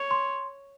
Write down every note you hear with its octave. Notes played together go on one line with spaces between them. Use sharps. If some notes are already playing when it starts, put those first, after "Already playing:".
Already playing: C#5
C6